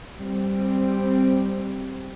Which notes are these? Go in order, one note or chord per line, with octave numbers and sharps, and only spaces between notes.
G3 C4